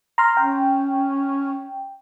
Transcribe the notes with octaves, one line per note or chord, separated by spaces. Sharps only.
A#5 C6 F6
C#4 G5